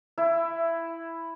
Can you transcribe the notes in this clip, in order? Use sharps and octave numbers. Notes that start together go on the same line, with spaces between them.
E4